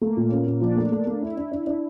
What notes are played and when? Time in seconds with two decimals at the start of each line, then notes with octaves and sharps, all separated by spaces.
0.01 A3 A#3
0.17 A#2
0.31 C#4
0.47 A#2
0.61 F3 D4
0.77 A3
0.92 A3
1.07 A3
1.22 D4 E4
1.37 D4
1.51 D4
1.67 D4